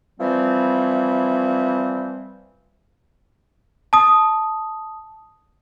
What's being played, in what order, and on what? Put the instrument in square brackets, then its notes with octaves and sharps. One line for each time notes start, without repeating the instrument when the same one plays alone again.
[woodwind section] E3 F3 G3 C4
[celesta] A5 D#6